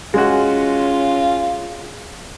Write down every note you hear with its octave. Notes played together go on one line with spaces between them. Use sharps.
G#3 C#4 F4 F#4